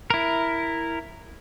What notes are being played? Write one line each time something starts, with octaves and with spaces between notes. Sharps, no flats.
E4 A#4